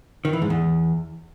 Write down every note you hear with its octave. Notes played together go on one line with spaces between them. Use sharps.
D#3
E3
G#2
E2